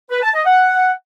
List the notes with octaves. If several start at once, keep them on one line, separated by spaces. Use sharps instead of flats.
B4
A5
D#5
F#5